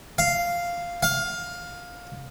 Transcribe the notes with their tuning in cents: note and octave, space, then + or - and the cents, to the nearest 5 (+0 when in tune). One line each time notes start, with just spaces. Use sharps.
F5 -5
F5 +15